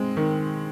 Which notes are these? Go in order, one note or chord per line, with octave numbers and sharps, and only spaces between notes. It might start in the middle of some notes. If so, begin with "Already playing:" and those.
Already playing: G#3 C4
D#3